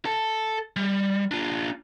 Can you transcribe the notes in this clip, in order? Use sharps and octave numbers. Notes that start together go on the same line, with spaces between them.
A4 A5
G3
D4 F4